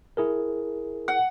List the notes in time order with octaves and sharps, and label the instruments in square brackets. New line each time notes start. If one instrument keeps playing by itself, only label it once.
[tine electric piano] E4 G#4 A#4
[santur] F#5